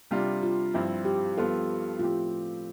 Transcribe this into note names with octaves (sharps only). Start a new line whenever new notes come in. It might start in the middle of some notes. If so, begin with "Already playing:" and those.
C3 G3 D4 F4
F4
G2 F3 C4 E4 G4
G4
G2 F3 B3 F4 A4
A2 F3 C4 F4 G4